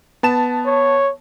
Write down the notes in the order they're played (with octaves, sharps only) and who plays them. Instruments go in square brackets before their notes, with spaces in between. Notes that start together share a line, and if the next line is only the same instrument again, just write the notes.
[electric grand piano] B3 A5 E7
[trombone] C#5